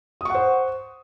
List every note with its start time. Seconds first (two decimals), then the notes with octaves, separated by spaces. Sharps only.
0.21 D#6
0.25 C#6
0.30 F#5
0.35 C5